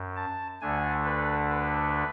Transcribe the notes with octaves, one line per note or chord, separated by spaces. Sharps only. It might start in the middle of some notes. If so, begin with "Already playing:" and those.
Already playing: F#2
A5
D2 D3 A3 D4 G#5
B4
B4